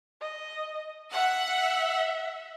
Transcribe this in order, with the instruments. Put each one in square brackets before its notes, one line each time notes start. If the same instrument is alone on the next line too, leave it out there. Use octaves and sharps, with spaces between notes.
[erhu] D#5
[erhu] E5 [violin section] F#5